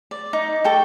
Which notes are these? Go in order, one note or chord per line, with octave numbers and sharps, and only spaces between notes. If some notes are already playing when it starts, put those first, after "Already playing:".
D5
D#4
A4 G5 C#6